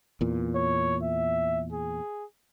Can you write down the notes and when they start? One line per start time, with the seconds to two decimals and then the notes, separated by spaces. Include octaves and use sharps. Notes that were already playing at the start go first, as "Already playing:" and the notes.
0.21 E2 A#2
0.55 C#5
1.02 E5
1.72 G#4